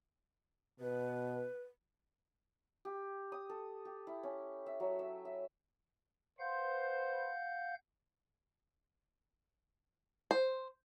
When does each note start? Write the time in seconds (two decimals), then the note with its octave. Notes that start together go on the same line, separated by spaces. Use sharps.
0.80 B2 B4
2.85 G4
3.32 D#6
3.50 A4
3.85 G4
4.07 E4
4.23 C#4
4.66 E5
4.80 F#3
4.99 E5
5.25 E5
6.40 B4 C5 F5 F#5 G6
10.31 C5